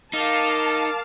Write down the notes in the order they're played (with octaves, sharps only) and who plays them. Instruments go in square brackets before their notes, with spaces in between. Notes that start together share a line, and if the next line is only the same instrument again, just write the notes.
[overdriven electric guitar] D#4 [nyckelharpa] A#4 D6 [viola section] F5 A5